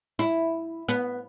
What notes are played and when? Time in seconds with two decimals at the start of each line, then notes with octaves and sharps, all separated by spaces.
0.19 E4
0.88 B3